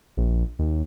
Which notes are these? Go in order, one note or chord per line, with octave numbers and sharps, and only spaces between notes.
A#1
D#2